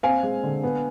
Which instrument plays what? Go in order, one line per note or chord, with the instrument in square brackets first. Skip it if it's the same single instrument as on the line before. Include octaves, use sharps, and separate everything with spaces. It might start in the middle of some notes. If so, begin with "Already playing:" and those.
[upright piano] C4 F5 G#5
G#3
D3
B3